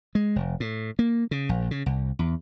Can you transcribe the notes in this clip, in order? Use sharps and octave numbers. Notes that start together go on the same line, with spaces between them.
G#3
F1
A2
A#3
C#3
A#1
C#3
C2
E2